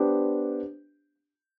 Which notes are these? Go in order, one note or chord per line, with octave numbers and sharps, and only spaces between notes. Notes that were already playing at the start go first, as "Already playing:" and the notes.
Already playing: B3 D4 G4 C5